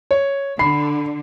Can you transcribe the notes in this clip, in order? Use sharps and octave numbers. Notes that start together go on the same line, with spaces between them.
C#5
D3 B5 C7